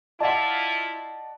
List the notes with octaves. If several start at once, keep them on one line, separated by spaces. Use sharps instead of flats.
E4 F4 D5 D#5 F#5 A5